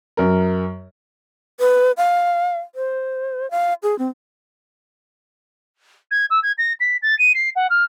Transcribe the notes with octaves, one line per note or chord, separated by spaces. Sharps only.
F#2 A#4
B4
F5
C5
F5
G#4
C4
G#6
E6
G#6
A#6
B6
A6
D#7
C7
F#5
F6